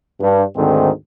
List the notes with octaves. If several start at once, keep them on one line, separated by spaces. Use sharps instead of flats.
G2
D2 G#2 D#3 A3 C4